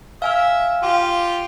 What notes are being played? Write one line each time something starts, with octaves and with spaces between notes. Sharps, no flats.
E5 F5 G#5 F6
F4 G4